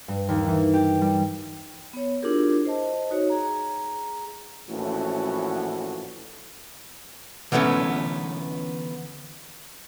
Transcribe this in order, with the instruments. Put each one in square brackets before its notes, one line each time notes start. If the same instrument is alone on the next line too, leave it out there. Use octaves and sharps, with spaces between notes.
[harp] G2
D#2
E3
G4
G3
[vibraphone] B3 C#5
D4 E4 F4 G4 G#4 A#4
C5 D#5 A5
D#4 F#4 C#5
G#4 A#5
[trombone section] A#1 A2 E3 C#4 F#4 A4
[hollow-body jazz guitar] D3 E3 A3 B3 C#4